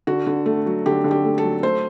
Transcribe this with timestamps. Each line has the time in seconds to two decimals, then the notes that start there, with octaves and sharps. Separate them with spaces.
0.07 D3 F#4
0.27 D3
0.46 A3
0.66 F#3
0.86 D3 G4
1.04 D3
1.11 G4
1.24 A3
1.38 A4
1.43 F#3
1.63 A3 C5